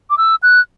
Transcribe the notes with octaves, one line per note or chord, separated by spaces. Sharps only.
D6
E6
F#6